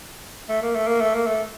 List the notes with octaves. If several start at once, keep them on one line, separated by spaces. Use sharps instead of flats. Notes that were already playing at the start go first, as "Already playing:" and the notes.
A3
A#3
A3
A#3
A3
A#3
A3